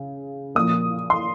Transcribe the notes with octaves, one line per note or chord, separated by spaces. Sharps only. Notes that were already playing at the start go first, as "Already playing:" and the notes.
Already playing: C#3
A#2 F3 A#3 D#6
C6